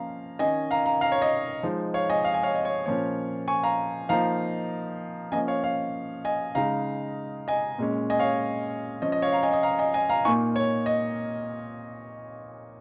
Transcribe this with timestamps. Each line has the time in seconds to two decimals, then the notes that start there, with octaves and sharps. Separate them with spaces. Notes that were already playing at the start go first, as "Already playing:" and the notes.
Already playing: F3 A#3 C#4 F5 A#5
0.39 D#3 C#4 D#5 G#5
0.71 F5 A#5
0.86 F5 A#5
1.01 F5 A#5
1.12 C#5
1.22 D#5
1.63 F3 G#3 D#4
1.94 C#5 F5
2.10 D#5 G#5
2.25 F5
2.34 G#5
2.43 C#5 F5
2.55 D#5
2.65 C#5
2.86 A#2 F3 A#3 C#4 C#5
3.48 G#5 C#6
3.63 F5 A#5
4.09 F3 A#3 D#4 F5 A#5
5.32 F3 A#3 C#4 D#5 G#5
5.48 C#5 F5
5.64 C#5 F5
6.25 D#5 G#5
6.55 C#3 G#3 D#4 F5 A#5
7.48 D#5 G#5
7.78 A#2 G#3 C#4
8.10 D#5 G#5
8.19 C#5 F5
9.02 F3 C#4 D#5
9.12 D#5
9.22 C#5 F5
9.32 F5 A#5
9.43 D#5 G#5
9.53 D#5
9.63 F5 A#5
9.79 D#5 G#5
9.94 D#5 G#5
10.09 F5 A#5
10.25 A#2 A#3 D#4 G#5 C#6
10.56 C#5
10.86 D#5